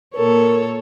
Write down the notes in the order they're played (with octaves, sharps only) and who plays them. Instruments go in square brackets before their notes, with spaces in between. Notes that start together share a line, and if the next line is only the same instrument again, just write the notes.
[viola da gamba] A#2 A4 C#5 [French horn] A#4